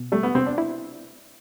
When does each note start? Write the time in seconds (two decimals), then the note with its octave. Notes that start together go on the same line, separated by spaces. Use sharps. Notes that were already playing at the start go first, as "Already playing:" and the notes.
Already playing: B2
0.12 G3 A3
0.23 B3
0.35 C3 C4
0.46 D4
0.58 E4